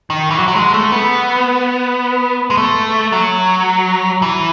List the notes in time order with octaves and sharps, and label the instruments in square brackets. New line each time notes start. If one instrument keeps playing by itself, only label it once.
[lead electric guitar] D#3
E3
F#3
F#3
G#3
A3
B3
G#3
A3
F#3
E3